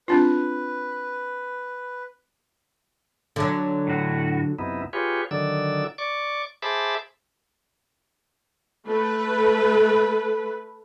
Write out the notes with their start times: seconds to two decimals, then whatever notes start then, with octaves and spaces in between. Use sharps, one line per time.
0.08 C4 D4 F4 B4
3.36 D3 F#3
3.87 A2 F#4
4.59 F#2 C3 B3 D#4 E4
4.93 F4 G4 G#4 B4 C#5
5.31 D3 D#3 F#3 D5 E6
5.98 D5 C#6 D6
6.62 G#4 C5 E5 A5 B5 D6
8.86 A3 B4